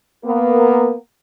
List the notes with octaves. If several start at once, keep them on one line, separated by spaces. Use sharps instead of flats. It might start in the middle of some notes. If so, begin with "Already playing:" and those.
A#3 B3 A#4